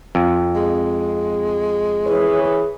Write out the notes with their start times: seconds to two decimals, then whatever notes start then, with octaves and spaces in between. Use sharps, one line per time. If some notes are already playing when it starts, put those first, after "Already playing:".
0.15 F2
0.56 G#3
2.06 E3 G#4 B4 C#5
2.44 G#4